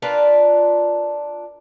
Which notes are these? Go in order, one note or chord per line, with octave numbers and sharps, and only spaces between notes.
D4 F4 A#4 B4